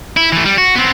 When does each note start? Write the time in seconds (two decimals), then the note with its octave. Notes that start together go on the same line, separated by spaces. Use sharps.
0.17 E4
0.33 E3 A3
0.45 G3
0.58 F#4
0.75 B3 C4